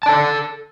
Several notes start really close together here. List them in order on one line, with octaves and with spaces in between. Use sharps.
A5 D5 A4